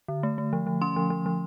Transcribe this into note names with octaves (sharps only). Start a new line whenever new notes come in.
D3
A3
A3
F3
F3
C#4 C6
F3
F3
F3